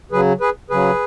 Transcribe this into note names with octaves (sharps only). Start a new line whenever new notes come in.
C#3 F#3 G#4 B4
G#4 B4
C#3 F#3 G#4 B4